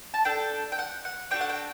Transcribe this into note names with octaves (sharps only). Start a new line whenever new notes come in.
A5
D4 A4 G5
G5
F#5
F#5
D4 F#4 A4 G5
F#5
G5